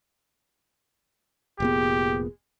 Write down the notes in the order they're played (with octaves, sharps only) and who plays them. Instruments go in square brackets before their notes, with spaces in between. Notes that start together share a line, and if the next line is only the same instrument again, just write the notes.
[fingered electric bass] F1 A#2 B3 [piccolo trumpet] G4 [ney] G#4